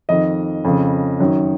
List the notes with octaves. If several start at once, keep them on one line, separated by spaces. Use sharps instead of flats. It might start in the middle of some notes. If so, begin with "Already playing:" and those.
F2 D#3 D#5
F2 C#3
F#2 D#3